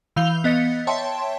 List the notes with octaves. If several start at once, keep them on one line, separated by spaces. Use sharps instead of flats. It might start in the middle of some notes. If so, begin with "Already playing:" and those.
E3 F5 G6 F7 G7
B3 D#5 A6 B6 C#7
C#5 E5 G5 A5 C6